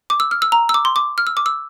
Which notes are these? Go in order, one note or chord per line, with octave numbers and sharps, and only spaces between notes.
D6
E6
F6
E6
A#5
E6
D6
C6
D6
F6
E6
D6
E6